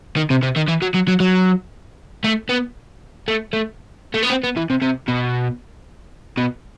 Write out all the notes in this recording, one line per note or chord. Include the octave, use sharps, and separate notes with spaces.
D#3
C3
C3
D#3
E3
F#3
F#3
F#3
F#3
A3
B3
A3
A3
A3
B3
C4
B3
E3
C3
C3
B2
B2